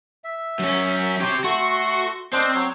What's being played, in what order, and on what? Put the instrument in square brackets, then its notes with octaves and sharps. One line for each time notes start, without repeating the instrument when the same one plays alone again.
[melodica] E5
[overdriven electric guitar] F#2 C#4
[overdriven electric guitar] G4 C5 [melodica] C#5 D6
[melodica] A3 C6 C#6 [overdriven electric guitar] F#4
[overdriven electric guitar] C4 [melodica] D4 C5 D#5
[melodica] F#3 C#5